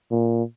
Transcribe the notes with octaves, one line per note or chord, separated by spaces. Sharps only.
A#2